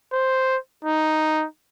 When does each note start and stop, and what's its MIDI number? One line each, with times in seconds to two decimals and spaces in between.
0.13 0.57 72
0.85 1.45 63